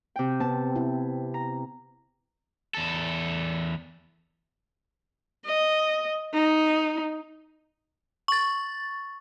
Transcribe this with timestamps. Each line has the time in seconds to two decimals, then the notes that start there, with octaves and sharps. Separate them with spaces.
0.16 C3 G5
0.40 B3 C4 A5
0.76 E4
1.34 A#5
2.74 E2 A4
5.45 D#5
6.33 D#4
8.28 C#6 A6